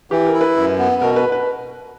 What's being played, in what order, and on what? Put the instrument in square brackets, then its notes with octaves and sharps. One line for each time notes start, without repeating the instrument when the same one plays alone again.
[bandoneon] E3 [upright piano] G4
[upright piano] A#4
[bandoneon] E4
[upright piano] B4
[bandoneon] F#2
B3
[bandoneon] B2 [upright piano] A#4
[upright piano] B4
B4